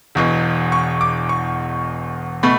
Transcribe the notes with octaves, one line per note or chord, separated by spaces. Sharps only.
E1 E2 B2
C#6
D6
C#6
B2 A3 B5